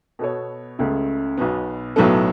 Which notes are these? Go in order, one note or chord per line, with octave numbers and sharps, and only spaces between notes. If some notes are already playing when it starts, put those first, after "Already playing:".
B2 B3 A4 C#5
C#2 C#3 A3
B1 B2 B3
B1 A2 F#3 B3 A4